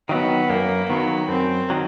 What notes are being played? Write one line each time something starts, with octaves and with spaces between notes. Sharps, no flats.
D#3 F#3 B3
F#2 A#3
D#3 F#3 B3
F#2 C4
D#3 F#3